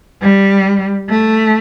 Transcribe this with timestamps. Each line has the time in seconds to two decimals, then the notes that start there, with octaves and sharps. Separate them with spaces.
0.22 G3
1.10 A3